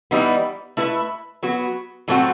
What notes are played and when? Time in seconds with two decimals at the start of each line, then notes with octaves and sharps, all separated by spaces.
0.11 E3 G3 B3 D#4
0.77 A3 E4 B4 E5
1.43 F#3 B3 F#4
2.08 A2 F#3 A3 C4 F#4